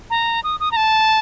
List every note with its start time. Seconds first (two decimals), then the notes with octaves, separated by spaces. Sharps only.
0.10 A#5
0.44 D#6
0.60 D#6
0.71 A#5
0.76 A5